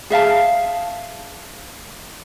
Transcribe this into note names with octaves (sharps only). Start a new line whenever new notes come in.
G#4 E5 F5 A5